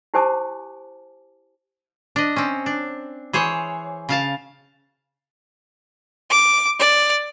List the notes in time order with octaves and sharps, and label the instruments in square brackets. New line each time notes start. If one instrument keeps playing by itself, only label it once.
[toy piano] E4 G4 C5 G#5 A5 D6
[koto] D4 D#5
C4 C#4
D4
E3 G#4 C5 C#5
C#3 F5 A5
[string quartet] D6
D5